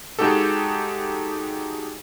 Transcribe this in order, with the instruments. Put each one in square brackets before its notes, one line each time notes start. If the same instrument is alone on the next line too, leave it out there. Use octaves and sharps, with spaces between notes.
[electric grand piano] G#3 D#4 F#4 G4 A4